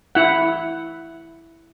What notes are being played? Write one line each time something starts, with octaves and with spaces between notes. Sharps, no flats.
E4 F#5